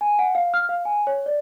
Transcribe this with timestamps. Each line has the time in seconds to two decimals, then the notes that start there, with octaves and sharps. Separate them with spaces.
0.01 G#5
0.19 F#5
0.35 F5
0.54 F6
0.69 F5
0.85 G#5
1.07 C#5
1.26 D5